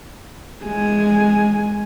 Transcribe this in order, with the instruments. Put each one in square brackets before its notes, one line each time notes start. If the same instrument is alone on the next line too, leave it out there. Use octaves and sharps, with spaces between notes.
[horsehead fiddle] G#3 G#5